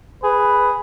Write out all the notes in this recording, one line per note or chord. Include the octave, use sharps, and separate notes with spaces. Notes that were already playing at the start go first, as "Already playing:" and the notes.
G#4 B4